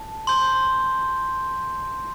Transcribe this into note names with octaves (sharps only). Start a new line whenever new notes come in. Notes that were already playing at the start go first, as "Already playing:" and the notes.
Already playing: A5
C6 G6